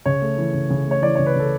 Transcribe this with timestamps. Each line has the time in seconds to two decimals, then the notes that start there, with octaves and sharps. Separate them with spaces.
0.06 C#3 C#5
0.22 A3
0.38 E3
0.54 C#3
0.70 C#3
0.86 A3 C#5
1.02 E3 D5
1.15 C#3 C#5
1.26 B4
1.35 C#3 A4